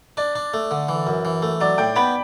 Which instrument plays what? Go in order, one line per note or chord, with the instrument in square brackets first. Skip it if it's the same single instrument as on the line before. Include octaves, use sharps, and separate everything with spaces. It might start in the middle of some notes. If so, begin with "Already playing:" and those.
[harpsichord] D4 [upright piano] D5
[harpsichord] D4
A3
D3
E3
F#2
E3
A3
[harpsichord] F#3 [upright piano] D5
[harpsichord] A2 [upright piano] G5
[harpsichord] B3 [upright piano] B5